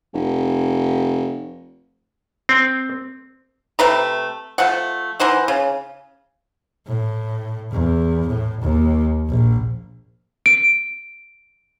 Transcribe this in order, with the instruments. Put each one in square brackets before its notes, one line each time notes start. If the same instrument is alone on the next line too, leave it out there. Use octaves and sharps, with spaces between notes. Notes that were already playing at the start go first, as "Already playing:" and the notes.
[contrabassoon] F1
[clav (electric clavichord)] C4
[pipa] C3 A3 B4 A#5
F3 A3 F#5
E3 D#4 C5 F#5
C#3
[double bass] A2
E2
A2
D#2
A#1
[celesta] D7